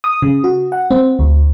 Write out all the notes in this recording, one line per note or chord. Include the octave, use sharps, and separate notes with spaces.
D#6
C#3
F#4
F#5
C4
D2